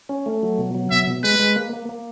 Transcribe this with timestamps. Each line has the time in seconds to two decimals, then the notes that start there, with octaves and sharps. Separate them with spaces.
0.09 C#4
0.26 A3
0.43 F#3
0.58 B2
0.75 F#3
0.91 B2 E5
1.07 B2
1.24 G#3 B4
1.39 G#3
1.56 A#3
1.73 A#3
1.89 A#3